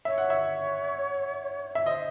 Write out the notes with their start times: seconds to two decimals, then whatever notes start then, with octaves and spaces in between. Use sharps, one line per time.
0.05 C#5 E5
0.18 F#5
0.30 E5
1.75 E5
1.86 C5 D#5